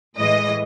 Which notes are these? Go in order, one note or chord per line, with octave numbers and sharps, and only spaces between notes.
A2 E3 G#3 D#5